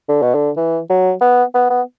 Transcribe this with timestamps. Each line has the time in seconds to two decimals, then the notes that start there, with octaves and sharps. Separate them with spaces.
0.09 D3
0.22 B2
0.35 D3
0.57 E3
0.90 F#3
1.21 B3
1.55 B3
1.70 B3